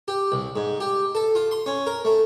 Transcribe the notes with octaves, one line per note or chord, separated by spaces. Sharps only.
G4
C2
G#2
G4
A4
F4
C6
C#4
A#4
A3